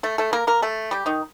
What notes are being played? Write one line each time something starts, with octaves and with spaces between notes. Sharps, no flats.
A3 A4
A3 A4
A#3 A#4
A#3 A#4
A3 A4
G3 G4
D#3 D#4